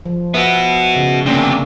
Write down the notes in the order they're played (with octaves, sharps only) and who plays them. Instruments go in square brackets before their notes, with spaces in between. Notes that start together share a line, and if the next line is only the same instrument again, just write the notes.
[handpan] F3
[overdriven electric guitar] B3 F#4 [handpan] B4 E5
[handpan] C#3
[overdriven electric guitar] D2 C3 [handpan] A#3 C#4 D4